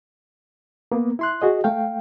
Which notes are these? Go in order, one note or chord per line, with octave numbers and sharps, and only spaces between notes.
A#3 B3
E4 C6 F#6
F#4 G#4 D#5
A3 F5 G5